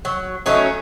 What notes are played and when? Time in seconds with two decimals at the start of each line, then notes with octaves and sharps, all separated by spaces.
0.05 F#3
0.46 F#3 A3 C#4 D#4